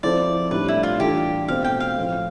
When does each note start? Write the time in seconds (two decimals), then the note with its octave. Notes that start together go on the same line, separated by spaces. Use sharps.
0.03 F3 C4 E4 A4 C5 D5
0.51 A2 G3 D4 B4
0.68 E4
0.83 F4
0.99 E3 G3 D4 F4 G4 A4
1.48 B2 A3 C4 F5
1.64 G5
1.80 F5
1.97 A2 F3 C4